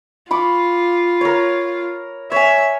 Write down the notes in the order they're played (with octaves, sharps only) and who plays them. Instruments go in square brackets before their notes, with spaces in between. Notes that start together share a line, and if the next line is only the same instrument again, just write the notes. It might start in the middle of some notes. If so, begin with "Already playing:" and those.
[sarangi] F4 [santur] B5 C#6 D6
[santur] A#4 C#5
[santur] C#5 G#5 [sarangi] E5